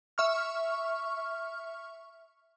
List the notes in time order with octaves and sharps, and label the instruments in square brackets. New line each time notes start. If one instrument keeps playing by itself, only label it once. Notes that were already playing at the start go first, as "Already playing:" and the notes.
[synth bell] E5 C#6 F6